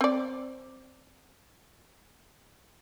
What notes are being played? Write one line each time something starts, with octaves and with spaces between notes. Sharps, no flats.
C4 D5